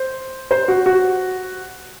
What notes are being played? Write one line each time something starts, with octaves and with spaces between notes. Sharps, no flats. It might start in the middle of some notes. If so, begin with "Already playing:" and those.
Already playing: C5
C5
F#4
F#4